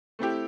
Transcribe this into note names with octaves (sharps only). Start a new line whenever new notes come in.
A3 C4 E4 G4